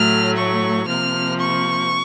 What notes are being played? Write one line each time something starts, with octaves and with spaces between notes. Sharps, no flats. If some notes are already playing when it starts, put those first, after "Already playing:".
Already playing: A2 F#3 A3 F6
C#6
C3 F3 A#3 F6
C#6